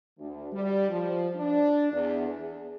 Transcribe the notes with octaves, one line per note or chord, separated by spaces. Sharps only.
D2
G3
F3
D4
E2
G#4